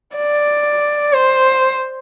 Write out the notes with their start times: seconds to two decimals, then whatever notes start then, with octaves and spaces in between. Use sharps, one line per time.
0.17 D5
1.14 C5